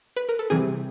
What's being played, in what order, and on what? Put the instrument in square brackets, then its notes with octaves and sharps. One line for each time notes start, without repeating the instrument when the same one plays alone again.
[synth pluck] B4
A#4
A4
[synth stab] C3 E3 G3 C4 [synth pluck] G#4